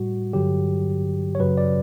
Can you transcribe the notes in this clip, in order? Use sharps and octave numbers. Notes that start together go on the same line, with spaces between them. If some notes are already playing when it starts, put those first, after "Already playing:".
Already playing: A2 G3 F#4
G2 D3 F#3 G4
C#5
F#2 C#3 F#3 B4
D5